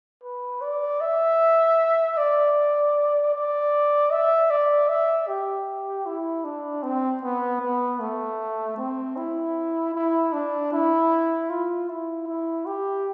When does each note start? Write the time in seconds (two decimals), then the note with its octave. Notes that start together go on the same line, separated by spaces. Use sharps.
0.24 B4
0.62 D5
1.01 E5
2.17 D5
3.34 D5
4.11 E5
4.51 D5
4.89 E5
5.28 G4
6.06 E4
6.45 D4
6.83 C4
7.23 B3
7.61 B3
8.00 A3
8.78 C4
9.17 E4
9.94 E4
10.33 D4
10.72 E4
11.50 F4
11.89 E4
12.27 E4
12.66 G4